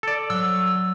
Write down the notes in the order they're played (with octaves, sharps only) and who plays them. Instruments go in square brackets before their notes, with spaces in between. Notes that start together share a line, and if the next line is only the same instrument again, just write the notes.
[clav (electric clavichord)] A4 D5
[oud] F#3 [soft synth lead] E6